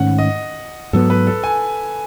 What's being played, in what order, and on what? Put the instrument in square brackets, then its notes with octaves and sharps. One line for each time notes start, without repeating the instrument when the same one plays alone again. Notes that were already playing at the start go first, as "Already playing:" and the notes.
Already playing: [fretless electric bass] G#2 D#3 A3 C#4 [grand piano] F#5
[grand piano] D#5
[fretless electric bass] G#2 F#3 B3 [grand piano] A4
[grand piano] B4
A4
G#5